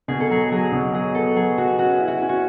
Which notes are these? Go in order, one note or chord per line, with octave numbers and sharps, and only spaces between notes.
B2 G#4
A4
F#3 G#4
F#3 G#4
B2
F#3 G#4
B3 A4
F#3 G#4
B3 F#4
C#4 F#4
E4
F#4
C#4
F#4